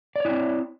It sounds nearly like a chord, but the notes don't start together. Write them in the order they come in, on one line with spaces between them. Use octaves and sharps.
D5 C#5 E4 C4